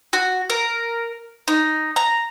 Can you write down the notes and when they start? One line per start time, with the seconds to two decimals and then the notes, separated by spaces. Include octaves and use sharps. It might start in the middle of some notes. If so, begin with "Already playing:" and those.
0.13 F#4
0.50 A#4
1.48 D#4
1.96 A#5